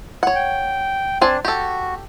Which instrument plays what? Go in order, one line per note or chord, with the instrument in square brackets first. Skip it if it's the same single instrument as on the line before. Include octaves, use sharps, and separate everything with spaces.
[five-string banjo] C#5 F#5
[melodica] G5
[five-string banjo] C4 G#5 A5 [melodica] D4
[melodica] F#4 [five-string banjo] G4 A4